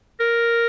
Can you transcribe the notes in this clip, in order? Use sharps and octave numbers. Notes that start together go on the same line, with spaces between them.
A#4